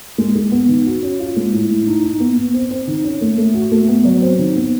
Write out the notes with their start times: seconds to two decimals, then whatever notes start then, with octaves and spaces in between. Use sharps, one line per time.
0.18 G#3
0.36 G#3
0.52 B3
0.68 D#3
0.86 F#4
1.03 C#4
1.20 F4
1.36 G#3
1.53 A2
1.70 A2
1.87 D#4
2.03 D#4
2.20 B3
2.37 B3
2.54 C4
2.70 C4
2.87 D#3
3.04 C#4
3.21 A3
3.38 A3
3.54 F#4
3.72 A3
3.88 B3
4.05 F#3
4.22 C4
4.39 D#3
4.56 B3